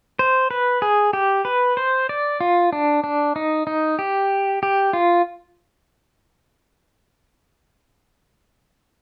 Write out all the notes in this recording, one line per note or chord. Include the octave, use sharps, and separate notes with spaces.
C5
B4
G#4
G4
B4
C5
D5
F4
D4
D4
D#4
D#4
G4
G4
F4